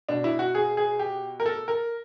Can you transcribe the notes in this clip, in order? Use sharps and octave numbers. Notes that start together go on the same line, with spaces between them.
B2 D4
E4
F#4
G#4
G#4
G4
A#4
A4
A#4